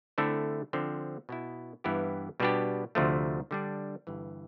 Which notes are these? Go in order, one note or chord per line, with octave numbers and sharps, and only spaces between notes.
D3 A3 C4 E4 A4
D3 F3 C4
B2 B3 E4
G2 E3 B3 E4 G4
B2 G3 B3 D4 G4
D2 C3 F3 A3
D3 G3 D4
G1 G2 E3